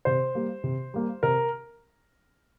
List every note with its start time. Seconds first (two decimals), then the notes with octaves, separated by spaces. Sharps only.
0.05 C3 C5
0.35 G3 A#3
0.64 C3
0.94 G3 A#3
1.23 C3 A#4